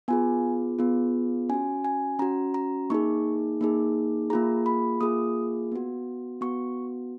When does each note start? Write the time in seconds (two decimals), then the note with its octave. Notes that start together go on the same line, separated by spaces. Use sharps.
0.08 B3 F4 G#4 G#5
0.79 B3 F4 G#4
1.49 C#4 F#4 G#5
1.85 G#5
2.19 C#4 F#4 A#5
2.54 A#5
2.90 A#3 D#4 G#4 C#6
3.61 A#3 D#4 G#4
4.30 A#3 F4 G#4 A#5
4.66 B5
5.01 A#3 F4 G#4 D#6
5.72 B3 F#4
6.41 B3 F#4 C#6